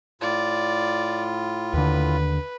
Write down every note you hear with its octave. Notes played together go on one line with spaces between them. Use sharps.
A2 F4 D5
D#2 D3 B4